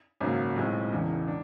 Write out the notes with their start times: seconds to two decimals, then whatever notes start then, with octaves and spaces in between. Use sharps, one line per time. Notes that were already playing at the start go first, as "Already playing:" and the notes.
0.21 G#1 F#2 C#3 F#3 A#3
0.56 B1 A2 F3 G#3 C4
0.92 E1 E2 C#3
1.28 D4